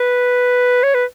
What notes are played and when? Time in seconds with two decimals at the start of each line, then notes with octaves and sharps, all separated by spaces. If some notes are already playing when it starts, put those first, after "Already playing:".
Already playing: B4
0.83 C#5
0.94 B4